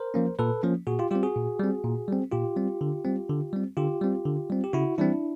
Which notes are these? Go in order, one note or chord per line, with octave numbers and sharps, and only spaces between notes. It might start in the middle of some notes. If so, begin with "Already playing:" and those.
Already playing: A#4 C5
F3 A#3 C#4
A#2 A4 B4
F3 A#3 C#4
A#2 F#4 G#4
F4 G4
G3 C4 F4 G4
F#4 G#4
A#2
G3 C4
A#2
G3 C4
A#2 F4 G4
G3 C4
D3
G3 C4
D3
G3 C4
D3 F4 G4
G3 C4
D3
G3 C4
G4
C#3 E4 F#4
E3 G3 C4 D4 E4